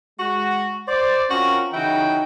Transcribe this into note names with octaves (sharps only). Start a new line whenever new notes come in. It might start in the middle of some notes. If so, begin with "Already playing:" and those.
G#3 F#4
C5 D5
C4 C#4 F4 F#4 A#4
C#3 E3 D#4 E4 F#4 G5